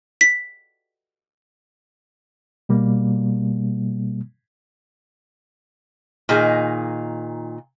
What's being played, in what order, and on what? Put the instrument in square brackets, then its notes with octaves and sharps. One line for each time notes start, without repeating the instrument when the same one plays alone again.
[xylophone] B6
[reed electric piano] B2 G3 A#3
[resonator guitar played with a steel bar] A#2 D#3 D#4 G#4